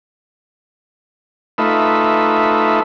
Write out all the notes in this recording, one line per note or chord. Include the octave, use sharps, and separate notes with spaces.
A3 D#4 F4 B4 E5